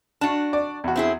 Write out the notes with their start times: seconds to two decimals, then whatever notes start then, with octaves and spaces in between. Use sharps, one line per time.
0.21 D4 F#4 A5
0.53 D5
0.84 E2 F#4
0.96 C4 E4 G#4